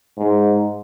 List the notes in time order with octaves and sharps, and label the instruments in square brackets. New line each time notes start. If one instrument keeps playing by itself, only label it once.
[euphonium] G#2